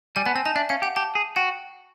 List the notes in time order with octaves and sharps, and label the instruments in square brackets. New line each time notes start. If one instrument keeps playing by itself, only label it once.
[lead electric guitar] G3 [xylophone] G#5
[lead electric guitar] B3 [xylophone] A5
[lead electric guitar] C4 [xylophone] G#5
[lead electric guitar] D#4 [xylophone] A5
[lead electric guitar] D4 [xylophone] E5
[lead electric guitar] C#4 [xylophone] F5
[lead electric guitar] G4 [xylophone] F#5
[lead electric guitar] G4 [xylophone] A5
[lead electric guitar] G#4
[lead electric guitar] F#4 [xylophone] G5